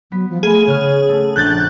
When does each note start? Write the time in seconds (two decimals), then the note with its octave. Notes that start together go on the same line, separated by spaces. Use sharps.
0.12 F#3 B3 B6
0.30 F3
0.43 A3 G#4 F5 B5
0.67 C#3 C#5 F#5 F6
1.09 A3
1.36 A#1 D4 F#6 G6 A6